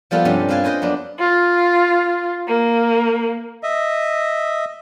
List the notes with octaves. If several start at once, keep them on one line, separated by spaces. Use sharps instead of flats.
F3 G3 B3 F4 A4 B4
G2 C3 C#4
C4 B4 F5 G#5 A5
C#4 B4 C5 D#5 G5
F#2 B3 D4
F4
A#3
D#5 E5